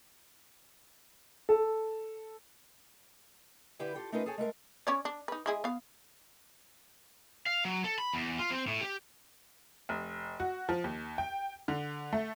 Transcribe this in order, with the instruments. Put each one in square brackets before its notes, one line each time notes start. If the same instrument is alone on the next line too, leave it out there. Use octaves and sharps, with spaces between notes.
[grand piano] A4
[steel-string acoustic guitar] D3 E4 G4 B4 G5
F4 G4 A4
A3 C#4 D#4 F4 A#4 B4
G#4 A4 C#5 G5 G#5
G#3 A3 A#4 F5
[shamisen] C#4 C#5 D5
D4
D#4 B4
G#3 E4 G#4
B3 F5
[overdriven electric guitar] F5
F#3
A4
B5
E2
F4
C4
A2
G4
[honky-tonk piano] F1
F#4
F3
D#2
G5
D3
A3